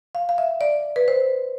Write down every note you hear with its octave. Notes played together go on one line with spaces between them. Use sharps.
F5
F5
E5
D5
B4
C5